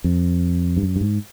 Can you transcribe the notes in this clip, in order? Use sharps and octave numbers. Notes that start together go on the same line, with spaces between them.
F2
G2
F#2
G2
G#2